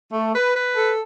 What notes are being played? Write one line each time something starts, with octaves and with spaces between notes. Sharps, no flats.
A3
B4
B4
A4